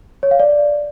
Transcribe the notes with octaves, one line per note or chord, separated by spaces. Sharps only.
C#5
F5
D5